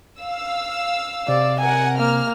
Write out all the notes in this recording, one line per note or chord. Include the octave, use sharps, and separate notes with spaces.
F5 E6
C3 D5
A#4 F#5 G#5
A#3 F6